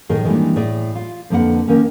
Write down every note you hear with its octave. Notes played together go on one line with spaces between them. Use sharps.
A2 D#3 G#4
D#3 E3 G3 G#3 A#3 D4
A2 G#4 D5
F4
F2 D3 A#3 B4 F#5
D#3 A#3 C#4